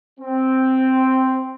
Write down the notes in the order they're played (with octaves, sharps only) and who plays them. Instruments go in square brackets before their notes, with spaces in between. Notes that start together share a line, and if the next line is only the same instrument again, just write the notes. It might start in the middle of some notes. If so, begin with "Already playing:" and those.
[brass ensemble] C4